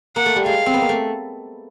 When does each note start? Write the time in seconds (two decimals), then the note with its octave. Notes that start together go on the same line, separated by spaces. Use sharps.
0.16 A#3 F#5
0.26 A3
0.36 G3
0.45 G#3 F5
0.66 C4
0.74 B3
0.82 A#3
0.89 A3